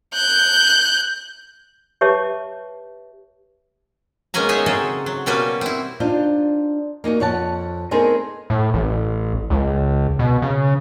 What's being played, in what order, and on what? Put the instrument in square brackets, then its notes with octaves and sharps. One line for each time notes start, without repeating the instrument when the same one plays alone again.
[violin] F#6 G6
[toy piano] G4 B4 C#5 E5 A5 D6
[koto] G#3 A#3 B3 C#4 G#5 A#5
D#4 G#4 C#5 D#5 E5
C#3 F#3 C4 G#4 A4
F#3
B2 G3 A#3 C#4 F#4 B4
C4 E4
[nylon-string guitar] D4 D#4 F4 C5
A#3 D#4 F4 F#4
F2 C#5 F#5 A5
A3 B3 C4 D#4 G#4 A#4
[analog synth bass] A2
A1
C#2
B2
C#3